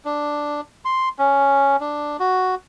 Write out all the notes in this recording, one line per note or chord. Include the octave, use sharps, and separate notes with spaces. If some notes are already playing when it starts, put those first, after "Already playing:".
D4
C6
C#4
D4
F#4